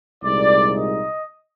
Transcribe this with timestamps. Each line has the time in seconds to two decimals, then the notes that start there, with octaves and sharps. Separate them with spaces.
0.22 C2 A#2 G#3 D#4 D5
0.75 D#5